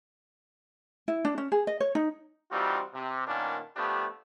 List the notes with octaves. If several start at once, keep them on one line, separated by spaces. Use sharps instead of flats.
E4
D4
C#4
G#4
D#5
C#5
D#4
E3 G3 C4 D#4 F4 F#4
C3
A#2 D#3 A#3 B3 C#4 D4
F3 A3 B3 D4 G4